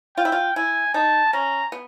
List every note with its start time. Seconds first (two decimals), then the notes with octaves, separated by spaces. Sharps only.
0.17 F4 G5
0.25 E4
0.32 F4
0.56 E4 G#5
0.94 D#4 A5
1.33 C#4 A#5
1.72 B3